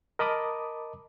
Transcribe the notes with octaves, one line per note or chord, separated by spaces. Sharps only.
A#4 D#5 A5 B5 D6 D#6